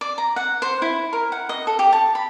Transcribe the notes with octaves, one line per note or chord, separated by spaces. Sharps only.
D5
A#5
F#5
C5
E4
A#4
F#5
D#5
A4
G4
A5
B5